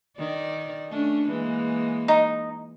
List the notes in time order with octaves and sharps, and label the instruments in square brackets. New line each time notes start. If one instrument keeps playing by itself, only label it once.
[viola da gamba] D#3 D5
A3 C#4 D4
E3 G#3 A#3
[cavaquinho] D#4